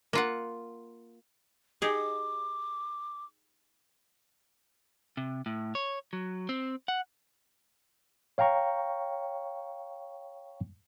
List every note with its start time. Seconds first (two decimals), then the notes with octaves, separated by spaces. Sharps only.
0.13 A#3 F4 F#5
1.82 D#4 G4 G#4 D6
5.17 C3
5.46 A2
5.75 C#5
6.13 F#3
6.49 C4
6.88 F#5
8.38 C#5 F5 G5 A#5 C#6